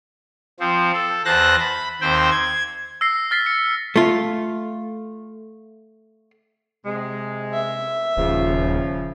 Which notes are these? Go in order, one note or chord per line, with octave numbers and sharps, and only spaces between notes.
F3 C4
A4
E2 C5 A5 F#6 A#6
B5
D#2 C4 C5 G5
G#6
E6 A#6 C7
F6 A6 B6 C7
C#7
A3 F4
C3 G#3
E5
D#1 C#3 F3